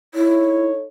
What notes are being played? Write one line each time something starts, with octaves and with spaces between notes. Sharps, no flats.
D#4 E4 A4 C#5